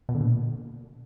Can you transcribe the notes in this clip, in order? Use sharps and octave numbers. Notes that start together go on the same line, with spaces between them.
B2
D3
A#2